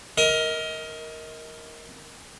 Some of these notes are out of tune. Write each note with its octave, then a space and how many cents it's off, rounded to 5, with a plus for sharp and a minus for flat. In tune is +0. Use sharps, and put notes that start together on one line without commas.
A#4 +0 D#5 +30